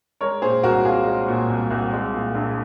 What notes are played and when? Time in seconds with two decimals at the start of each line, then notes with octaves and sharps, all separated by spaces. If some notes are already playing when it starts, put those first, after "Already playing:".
0.21 G#3 A#4 C#5
0.42 A#2 G#4 C5
0.63 C2 F#4 A#4
0.85 C2 F4 G#4
1.07 G#3
1.28 A#2
1.49 C2
1.71 C2
1.92 G#3
2.14 A#2
2.35 A#1